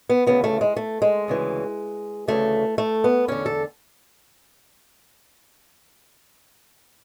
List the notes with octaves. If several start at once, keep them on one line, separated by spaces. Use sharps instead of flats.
B3
D2 C#3 E3 B3
A3
G#3
A3
G#3
D2 C#3 E3
D2 C#3 E3 A3
A3
B3
E2 D3 C#4
A4